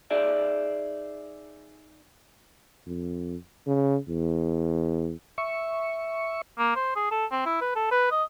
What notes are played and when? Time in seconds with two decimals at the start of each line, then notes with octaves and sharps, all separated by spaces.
0.11 D#4 G#4 D5 E5
2.87 F2
3.67 C#3
4.09 E2
5.38 E5 C#6
6.59 A#3
6.76 C5
6.96 G#4
7.11 A4
7.31 C4
7.46 E4
7.61 B4
7.75 A4
7.91 B4
8.11 D#5